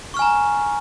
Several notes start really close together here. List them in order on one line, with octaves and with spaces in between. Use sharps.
C#6 F6 G#5 A#5